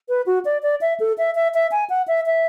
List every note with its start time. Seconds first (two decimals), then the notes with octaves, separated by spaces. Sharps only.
0.09 B4
0.26 F#4
0.45 D5
0.63 D5
0.81 E5
1.00 A4
1.18 E5
1.35 E5
1.54 E5
1.72 G#5
1.90 F#5
2.08 E5
2.26 E5